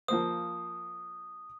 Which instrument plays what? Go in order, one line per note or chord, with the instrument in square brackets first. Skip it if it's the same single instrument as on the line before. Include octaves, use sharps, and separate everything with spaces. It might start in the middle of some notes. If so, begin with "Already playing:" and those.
[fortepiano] F3 A#3 C5 [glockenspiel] D#6